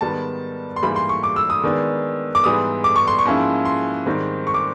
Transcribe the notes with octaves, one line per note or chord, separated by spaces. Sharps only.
G#2 D#3 G3 B3 A5
C6
G#2 E3 G3 A#3 B5
C6
C#6
D6
E6
D#6
D#3 G#3 B3 D4
D6
G#2 E3 G3 B3 D#6
D6
C#6
C6
C#6
G#2 F3 A#3 C#4 E4
C6
G#2 D#3 G3 C4
C#6
D6